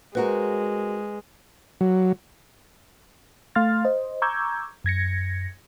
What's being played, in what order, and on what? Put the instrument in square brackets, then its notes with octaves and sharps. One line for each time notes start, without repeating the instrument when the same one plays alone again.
[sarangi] G#3 [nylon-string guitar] C4 F#4 A#4 [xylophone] B4
[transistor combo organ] F#3
[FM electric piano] A3 F5 C6 F6 A6
C5 D#5
A#5 C#6 D6 E6 G6 G#6
F#2 G#6 A#6 C#7